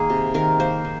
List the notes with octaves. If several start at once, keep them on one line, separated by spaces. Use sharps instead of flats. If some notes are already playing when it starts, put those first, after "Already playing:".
Already playing: D#3 A#3 G#4
C3
D#3 A#4
A#3 C5
D#3